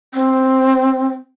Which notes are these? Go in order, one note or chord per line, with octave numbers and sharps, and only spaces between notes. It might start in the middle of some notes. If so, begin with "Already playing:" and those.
C4